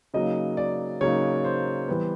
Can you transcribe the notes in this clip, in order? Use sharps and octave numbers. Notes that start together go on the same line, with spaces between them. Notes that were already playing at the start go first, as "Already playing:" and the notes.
C#3 F#3 A#3 D#4 D#5
D5
C#3 F#3 A#3 D#4 C#5
C5
E3 G3 B3